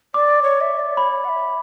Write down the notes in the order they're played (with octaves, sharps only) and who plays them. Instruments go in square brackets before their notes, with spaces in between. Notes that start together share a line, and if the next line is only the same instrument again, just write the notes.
[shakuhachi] D5 [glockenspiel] D6
[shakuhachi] C#5
E5
D5
[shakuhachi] C#5 [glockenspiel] B5
[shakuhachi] F#5
E5